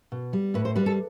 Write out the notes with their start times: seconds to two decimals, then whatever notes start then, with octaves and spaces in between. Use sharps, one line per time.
0.12 B2
0.33 G3
0.54 A2 B4
0.65 C5
0.76 G3 B4
0.86 A4